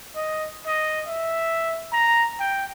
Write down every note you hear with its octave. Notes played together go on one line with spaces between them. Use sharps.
D#5
D#5
E5
A#5
G5